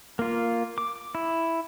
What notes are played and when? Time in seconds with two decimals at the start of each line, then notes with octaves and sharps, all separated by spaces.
0.19 A#3 F4
0.78 D6
1.15 E4